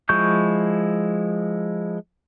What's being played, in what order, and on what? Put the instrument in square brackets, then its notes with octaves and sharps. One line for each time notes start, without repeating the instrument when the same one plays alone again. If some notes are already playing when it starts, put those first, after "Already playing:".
[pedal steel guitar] F3 G#3 E4 C#6 G6